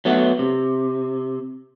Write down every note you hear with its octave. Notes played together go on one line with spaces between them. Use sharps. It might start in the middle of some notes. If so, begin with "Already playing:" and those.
F#3 A3 B3
C3